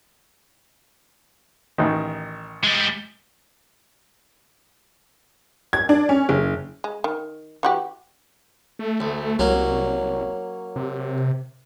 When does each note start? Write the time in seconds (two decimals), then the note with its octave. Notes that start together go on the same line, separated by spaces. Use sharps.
1.78 A1 D#3
2.64 G3 G#3
5.73 G#6
5.89 D4
6.09 C#4
6.29 F#1
6.84 G#3
7.04 D#3
7.63 E3 F#4 G4
8.79 A3
9.00 D2
9.39 C2 F#3 A#3 C#4
10.76 C3